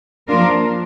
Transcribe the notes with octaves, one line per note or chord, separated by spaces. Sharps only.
F3 A#3 D4 F4 A#4